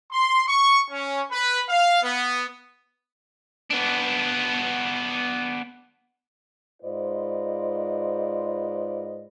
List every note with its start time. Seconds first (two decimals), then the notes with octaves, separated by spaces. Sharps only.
0.12 C6
0.47 C#6
0.91 C#4
1.30 B4
1.69 F5
2.03 B3
3.70 B3 D4
6.83 G#2 F4 B4 C5 D5 D#5